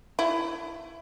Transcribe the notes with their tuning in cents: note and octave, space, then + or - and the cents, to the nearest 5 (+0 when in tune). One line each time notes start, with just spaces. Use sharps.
E4 +25